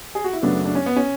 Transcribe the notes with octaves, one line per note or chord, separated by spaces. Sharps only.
G#4
F#4
E4
F#2 C#3 F#3 A3 B3 D4
D4
C#4
B3
C#4